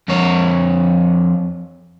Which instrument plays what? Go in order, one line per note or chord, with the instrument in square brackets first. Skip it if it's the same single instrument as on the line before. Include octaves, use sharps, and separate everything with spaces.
[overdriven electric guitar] F2 C#5